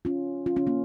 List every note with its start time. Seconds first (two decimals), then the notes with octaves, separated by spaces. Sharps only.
0.05 C#4 F4
0.46 C#4 F4
0.56 C#4 F4
0.67 A#3 C#4